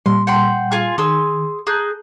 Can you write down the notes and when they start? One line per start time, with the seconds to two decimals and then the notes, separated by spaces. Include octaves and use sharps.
0.06 A#2 G3 C6
0.27 F#5 G5 C6
0.72 F4 G#4
0.98 D#3 G#4 C6 E6
1.67 G#4 A#5 F#6 G6